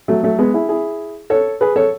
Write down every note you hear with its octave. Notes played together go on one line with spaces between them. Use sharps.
F#3 A3
F#3 A3
G#3 B3
E4 G#4
E4 G#4
A4 C#5
G#4 B4
A4 C#5